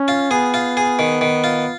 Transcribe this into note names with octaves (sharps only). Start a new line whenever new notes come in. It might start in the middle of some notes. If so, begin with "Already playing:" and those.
Already playing: C#4
F4
B3 G#4
F4
G#4
D#3
D#3
F4